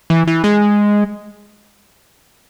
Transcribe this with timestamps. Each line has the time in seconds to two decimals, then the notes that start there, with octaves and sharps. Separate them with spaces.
0.10 E3
0.27 E3
0.44 G#3